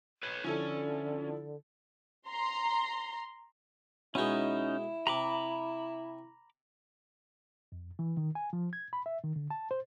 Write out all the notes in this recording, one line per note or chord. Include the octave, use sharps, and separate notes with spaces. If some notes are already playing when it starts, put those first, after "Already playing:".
B4 C#5
D3 F3 C#4 E4 A4
A#5 C6
B2 G#3 C#4 D#4 E4
C3 A#5 B5 D6
F2
E3
D#3
G#5
F3
G#6
B5
E5
D#3
D3
A5
C5